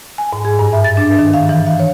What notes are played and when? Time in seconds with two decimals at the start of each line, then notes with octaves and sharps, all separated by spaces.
0.18 G#5
0.33 G#2
0.45 G#4
0.59 G2
0.73 E5
0.84 A6
0.97 D4
1.19 D#3
1.34 F5
1.49 E3
1.67 F5
1.80 C#5